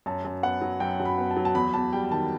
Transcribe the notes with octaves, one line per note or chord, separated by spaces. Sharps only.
F#2 A5
F#2
B3 F#5
F#3
F#2 G5
F#2
B5
B3
A5
F#3
A5
E2 B5
E2 A5
G3 G5
D#3 A5